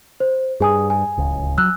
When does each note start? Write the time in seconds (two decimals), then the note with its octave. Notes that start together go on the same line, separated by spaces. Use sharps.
0.20 C5
0.60 G2 G#4 G#5 D#6
0.90 G#5
1.17 D1 C#2
1.58 F#3 E6 F#6